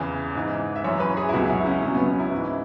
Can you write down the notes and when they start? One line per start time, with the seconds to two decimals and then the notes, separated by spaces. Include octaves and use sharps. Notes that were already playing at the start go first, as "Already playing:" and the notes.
Already playing: E2 C#3 E3
0.35 G#2 E3
0.76 E5
0.84 F#2 E3 C#5
1.00 B4
1.17 G#4
1.29 E4
1.33 C#2 B2 F#3 F#4
1.49 E4
1.61 E4
1.66 C#4
1.82 C#2 B2 F#3 C#4
1.95 B3
2.07 C#4
2.19 E4
2.32 G#2 E3